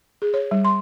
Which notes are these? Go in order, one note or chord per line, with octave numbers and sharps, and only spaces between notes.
G#4
C#5
G3
C6